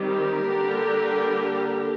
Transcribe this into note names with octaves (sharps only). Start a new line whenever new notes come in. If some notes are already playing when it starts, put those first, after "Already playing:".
Already playing: D#3 G3 C4
G4 A#4
D3 G3 A#3 D4